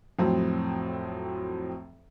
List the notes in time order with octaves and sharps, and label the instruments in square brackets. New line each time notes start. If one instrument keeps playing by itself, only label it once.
[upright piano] F2 A2 F#3 C4